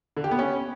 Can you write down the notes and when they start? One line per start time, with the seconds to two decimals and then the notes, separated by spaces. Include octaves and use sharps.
0.17 D3
0.24 G4
0.31 B3
0.39 C#4